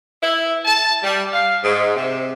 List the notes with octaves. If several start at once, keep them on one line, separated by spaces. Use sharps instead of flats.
E4
A5
G3
F5
G#2
C3